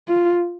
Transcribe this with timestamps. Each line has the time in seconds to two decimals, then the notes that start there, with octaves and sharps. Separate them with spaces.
0.08 F4